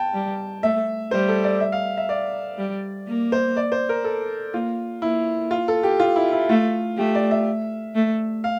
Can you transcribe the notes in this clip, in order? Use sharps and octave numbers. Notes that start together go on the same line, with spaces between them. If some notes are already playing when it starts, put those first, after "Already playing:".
Already playing: G5 A5
G3
A3 E5
G3 C5
A4
D5
E5
F5
E5
D5
G3
A#3
C5
D5
C5
A#4
A4
A#3 F4
A#3 E4
F4
A4
G4
F4
E4
E4
A3 F4
A3 G4
D5
E5
A3
F5